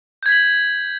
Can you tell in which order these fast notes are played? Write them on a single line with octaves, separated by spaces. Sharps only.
G6 G#6 B6 F#7